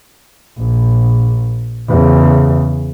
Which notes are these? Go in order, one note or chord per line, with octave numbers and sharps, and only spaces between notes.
A#1
E2 C#3